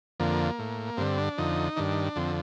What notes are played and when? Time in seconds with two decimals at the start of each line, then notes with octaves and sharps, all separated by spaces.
0.20 F2 D3 A#3
0.59 A2
0.97 G2 D3 C4
1.18 D4
1.38 F2 D3 D#4
1.76 G2 D#3 D4
2.16 F2 D3 C4